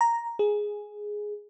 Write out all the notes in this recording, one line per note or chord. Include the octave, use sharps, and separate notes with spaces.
A#5
G#4